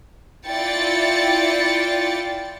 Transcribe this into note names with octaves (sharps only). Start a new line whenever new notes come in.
E4 F4 D5 G5 A6 C#7